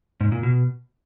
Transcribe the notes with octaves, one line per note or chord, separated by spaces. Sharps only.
G#2
A#2
B2